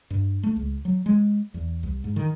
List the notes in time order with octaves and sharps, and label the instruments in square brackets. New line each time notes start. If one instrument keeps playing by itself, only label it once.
[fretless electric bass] G2
A3
C#2
F#3
G#3
E2
C2
G#2
D#3